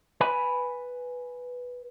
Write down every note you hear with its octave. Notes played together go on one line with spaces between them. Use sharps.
B4 G#5 B5